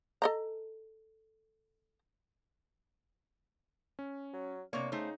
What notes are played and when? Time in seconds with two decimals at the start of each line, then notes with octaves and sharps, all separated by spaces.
0.22 A4 D#5 A#5
3.99 C#4
4.33 F#3
4.73 C3 A#3 D4 C#5 C#6
4.92 C#3 A3 D#4 C5